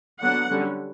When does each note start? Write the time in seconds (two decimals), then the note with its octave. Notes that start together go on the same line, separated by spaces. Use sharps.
0.19 D3 F#3 B3 D4 F#5
0.50 D3 G3 C#4